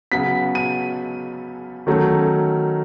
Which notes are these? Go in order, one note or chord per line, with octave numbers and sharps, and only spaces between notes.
C#3 F#3 B3 B6
D#7
D#3 F#3 A3 C#4